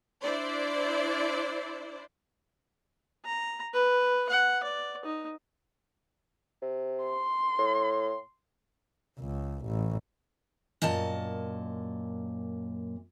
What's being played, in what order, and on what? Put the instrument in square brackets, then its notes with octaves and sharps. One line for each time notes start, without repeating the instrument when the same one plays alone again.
[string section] D4 E4 C5 D5
[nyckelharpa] A#5
B4
F#5
D5
D#4
[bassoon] C3
[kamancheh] C6
[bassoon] A2
[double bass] C#2
A1
[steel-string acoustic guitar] F#2 A#2 D#5 A5